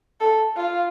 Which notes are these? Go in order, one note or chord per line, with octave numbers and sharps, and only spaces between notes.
A4
F4